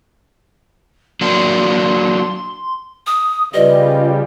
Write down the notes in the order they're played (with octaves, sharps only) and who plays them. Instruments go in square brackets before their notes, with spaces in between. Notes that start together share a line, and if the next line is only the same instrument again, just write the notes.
[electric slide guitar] F#3 A#3 D4 [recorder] C6
[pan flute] D#6
[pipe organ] C#3 G3 [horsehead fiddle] F4 [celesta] G4 B4 D5 [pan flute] D#5